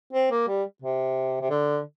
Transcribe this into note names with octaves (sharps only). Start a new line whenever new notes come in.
C4
A#3
G3
C3
C3
D3